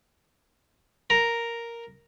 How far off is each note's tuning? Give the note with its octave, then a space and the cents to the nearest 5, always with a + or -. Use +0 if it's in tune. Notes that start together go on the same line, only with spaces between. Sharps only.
A#4 +0 A#5 +0